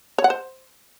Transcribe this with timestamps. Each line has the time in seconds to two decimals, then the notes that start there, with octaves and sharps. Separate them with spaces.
0.18 C#5
0.24 F#5
0.30 C5